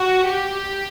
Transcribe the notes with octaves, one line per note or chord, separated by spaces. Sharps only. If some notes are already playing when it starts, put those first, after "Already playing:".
Already playing: F#4
G4